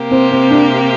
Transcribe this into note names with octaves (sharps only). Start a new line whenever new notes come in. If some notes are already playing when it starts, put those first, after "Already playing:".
Already playing: C3 A#3 G4
C4
C4
D4